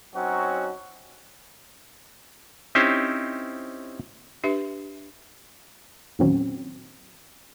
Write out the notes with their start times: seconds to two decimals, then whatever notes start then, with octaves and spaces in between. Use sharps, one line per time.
0.14 F#3 C4 C#4 D#4 F#4
2.75 C4 C#4 D#4 E4 G4 C5
4.44 D4 G4 B4 E5
6.19 E2 A#2 D#3 F#3 C4 C#4